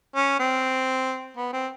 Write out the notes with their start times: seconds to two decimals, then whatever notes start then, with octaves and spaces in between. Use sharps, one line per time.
0.15 C#4
0.39 C4
1.37 B3
1.53 C4